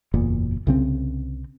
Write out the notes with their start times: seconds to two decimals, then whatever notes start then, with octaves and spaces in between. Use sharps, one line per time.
0.14 F#1 E2 A#2
0.67 C2 C#3 C4